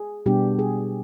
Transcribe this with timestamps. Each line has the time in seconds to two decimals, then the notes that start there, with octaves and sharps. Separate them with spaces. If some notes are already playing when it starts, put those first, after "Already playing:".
Already playing: G#4
0.26 B2 G3 B3 D4 G4
0.59 G#4